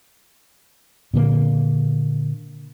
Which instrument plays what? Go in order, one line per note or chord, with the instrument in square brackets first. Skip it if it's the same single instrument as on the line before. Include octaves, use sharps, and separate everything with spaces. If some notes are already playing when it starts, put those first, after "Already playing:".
[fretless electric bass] A#2 D3 A#3